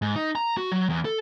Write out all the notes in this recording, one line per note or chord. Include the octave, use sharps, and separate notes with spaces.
G#2
D#4
A#5
F#4
F#3
E2
A4